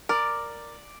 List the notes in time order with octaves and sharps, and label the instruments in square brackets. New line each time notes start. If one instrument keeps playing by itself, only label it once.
[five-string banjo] A#4 [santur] D5